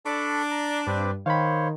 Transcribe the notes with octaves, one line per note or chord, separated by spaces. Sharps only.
D4 A4 B5 C#6
A#5
G2 C4 B4 D6
D#3 C5 C#5 F5 B5